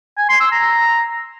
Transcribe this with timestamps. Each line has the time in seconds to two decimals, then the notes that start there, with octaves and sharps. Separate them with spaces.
0.17 G#5
0.29 C6
0.40 E6
0.52 A#5